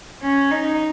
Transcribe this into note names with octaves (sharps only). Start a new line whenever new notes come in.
C#4
D#4